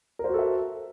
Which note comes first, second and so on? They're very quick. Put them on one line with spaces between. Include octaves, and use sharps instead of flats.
A#4 C5 F#4 A4 E5